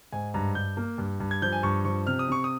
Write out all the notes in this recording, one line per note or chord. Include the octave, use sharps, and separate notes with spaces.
G#2 G#5
G2 A#5
G2 G6
A#3
G2
G2
G#6
F3 G6
G#5
G2 C#6
F3 C#6
C3 F6
D#6
C3 C#6
D#6